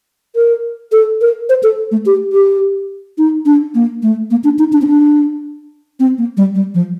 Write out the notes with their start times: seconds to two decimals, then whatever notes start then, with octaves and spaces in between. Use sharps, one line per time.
0.36 A#4
0.92 A4
1.21 A#4
1.49 C5
1.63 A4
1.92 A3
2.06 G4
2.33 G4
3.18 D#4
3.46 D4
3.75 A#3
4.03 A3
4.31 A#3
4.44 D4
4.59 D#4
4.73 D4
4.82 C4
4.87 D4
6.00 C4
6.18 A#3
6.37 G3
6.55 G3
6.75 F3